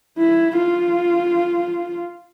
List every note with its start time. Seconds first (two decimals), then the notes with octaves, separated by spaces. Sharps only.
0.18 E4
0.57 F4